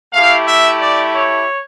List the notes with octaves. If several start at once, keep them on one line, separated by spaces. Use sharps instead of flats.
A3 E4 G4 F5
E5
D5
C#5